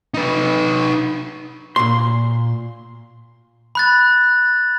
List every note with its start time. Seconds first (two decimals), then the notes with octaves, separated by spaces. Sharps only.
0.14 D#4 B4
1.76 A#2 C6
3.75 B5 F#6 A6